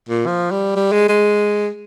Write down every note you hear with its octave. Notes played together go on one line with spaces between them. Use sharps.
A#2
F3
G3
G3
G#3
G#3